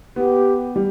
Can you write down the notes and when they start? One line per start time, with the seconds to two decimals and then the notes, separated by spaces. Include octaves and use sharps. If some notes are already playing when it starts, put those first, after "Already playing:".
0.16 B3 G4
0.76 G3